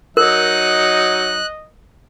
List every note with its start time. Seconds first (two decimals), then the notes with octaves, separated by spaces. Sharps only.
0.17 F#3 D#4 A#4 D#5 F#6